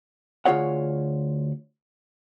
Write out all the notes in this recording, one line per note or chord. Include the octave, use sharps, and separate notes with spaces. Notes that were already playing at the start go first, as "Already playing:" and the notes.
D2 F4 G#4 C#5 F#5